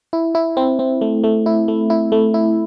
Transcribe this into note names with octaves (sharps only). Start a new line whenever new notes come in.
E4
E4
C4
C4
A3
A3
E4
A3
E4
A3
E4